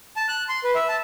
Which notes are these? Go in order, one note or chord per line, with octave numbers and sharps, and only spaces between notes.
A5
F#6
C6
B4
E5
A5